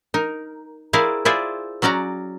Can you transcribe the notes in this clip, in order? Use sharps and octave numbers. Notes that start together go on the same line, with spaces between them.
D#4 A#4
E4 G#4 A#4 C5 D5 F5
E4 F4 G#4 C5 D5 E5
F#3 C#4 F#4 D5 A#5